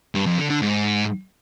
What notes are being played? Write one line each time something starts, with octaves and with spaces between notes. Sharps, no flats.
G2
F2
D3
D3
G#2